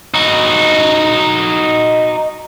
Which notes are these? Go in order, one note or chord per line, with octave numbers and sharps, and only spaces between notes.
D#4 F#4